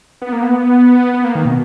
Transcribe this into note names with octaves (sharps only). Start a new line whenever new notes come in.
B3
A#3
B3
B3
A#3
D#3
B2